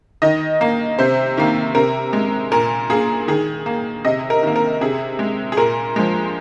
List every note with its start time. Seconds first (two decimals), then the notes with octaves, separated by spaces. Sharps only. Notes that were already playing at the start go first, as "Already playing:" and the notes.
0.22 D#3 D#5
0.61 A#3
0.99 C3 C5
1.37 D#3 A#3
1.75 C3 A#4
2.13 G#3
2.52 A#2 A#4
2.90 A#3 G#4
3.28 D#3 G#4
3.66 A#3
4.05 C3 D#5
4.30 A#4
4.43 D#3 A#3
4.56 A#4
4.81 C3 G#4
5.19 G#3
5.52 G#4
5.57 A#2 A#4
5.96 F3 G#3